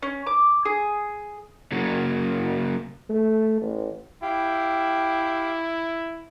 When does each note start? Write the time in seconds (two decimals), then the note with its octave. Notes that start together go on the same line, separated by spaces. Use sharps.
0.02 C#4
0.26 D6
0.65 G#4
1.72 C#3 F#3 A#3
3.10 A3
3.62 A1
4.22 E4 G4 F5 G5